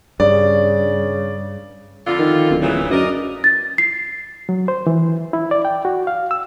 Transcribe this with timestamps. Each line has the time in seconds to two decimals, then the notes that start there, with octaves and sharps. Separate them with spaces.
0.20 G2 C#3 D5
2.07 F2 D3 F4
2.19 D#3
2.50 D1
2.62 A#2 C#3 E3
2.91 F#2 A#4 D5 D#5
3.44 A6
3.78 C7
4.49 F#3
4.68 C5
4.87 E3
5.33 E4
5.51 D5
5.65 G5
5.85 F#4
6.07 F5
6.31 E6